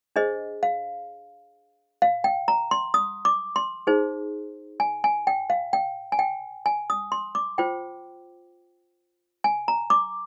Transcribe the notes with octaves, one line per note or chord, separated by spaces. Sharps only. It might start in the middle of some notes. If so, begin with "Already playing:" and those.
D4 G#4 C5 D#5
F5
F5
G5
A#5
C6
D#6
D6
C6
D#4 G#4 C5
G#5
G#5
G5
F5
G5
G#5
G5
G#5
D#6
C6
D6
F4 C5 G5
G#5
A#5
D6